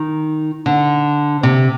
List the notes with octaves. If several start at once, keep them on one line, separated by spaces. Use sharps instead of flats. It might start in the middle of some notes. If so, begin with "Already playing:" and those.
Already playing: D#3
D3
C3